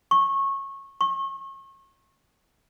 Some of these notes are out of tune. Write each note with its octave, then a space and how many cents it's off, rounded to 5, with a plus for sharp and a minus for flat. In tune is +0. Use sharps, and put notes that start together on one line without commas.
C#6 -20
C#6 -35